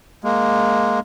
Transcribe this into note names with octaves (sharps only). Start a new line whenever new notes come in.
G#3 A#3